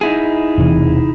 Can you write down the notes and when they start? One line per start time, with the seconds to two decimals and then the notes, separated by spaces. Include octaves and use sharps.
0.01 D#4 E4 G#4
0.58 E1 C3 E3